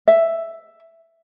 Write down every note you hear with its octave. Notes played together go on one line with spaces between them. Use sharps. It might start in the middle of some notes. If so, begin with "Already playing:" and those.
E5